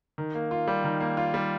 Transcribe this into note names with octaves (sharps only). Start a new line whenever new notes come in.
D#3
A#3
F4
G3
D#3
A#3
F4
G3